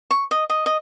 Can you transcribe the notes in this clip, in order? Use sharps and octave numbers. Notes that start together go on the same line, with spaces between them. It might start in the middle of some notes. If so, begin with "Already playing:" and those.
C#6
D#5
D#5
D#5